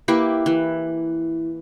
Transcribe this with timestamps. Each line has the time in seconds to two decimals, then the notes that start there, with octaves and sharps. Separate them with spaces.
0.08 A#3 E4 G4 B4
0.46 E3